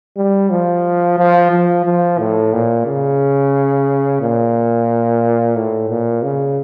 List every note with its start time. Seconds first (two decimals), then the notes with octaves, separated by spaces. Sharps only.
0.17 G3
0.50 F3
1.18 F3
1.51 F3
1.85 F3
2.19 A2
2.53 A#2
2.86 C#3
4.21 A#2
5.56 A2
5.90 A#2
6.23 C#3